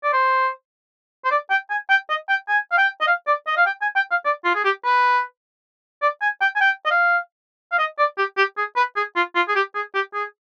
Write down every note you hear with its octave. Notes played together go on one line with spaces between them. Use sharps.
D5
C5
C5
D5
G5
G#5
G5
D#5
G5
G#5
F5
G5
D#5
F5
D5
D#5
F5
G5
G#5
G5
F5
D5
F4
G#4
G4
B4
D5
G#5
G5
G#5
G5
D#5
F5
F5
D#5
D5
G4
G4
G#4
B4
G#4
F4
F4
G#4
G4
G#4
G4
G#4